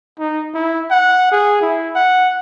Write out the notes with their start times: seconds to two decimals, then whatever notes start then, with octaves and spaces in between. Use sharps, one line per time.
0.19 D#4
0.54 E4
0.91 F#5
1.32 G#4
1.61 E4
1.96 F#5